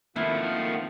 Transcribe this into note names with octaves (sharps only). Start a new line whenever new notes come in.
D#3 F3 A3 A#3 C4 E4 F5 F#5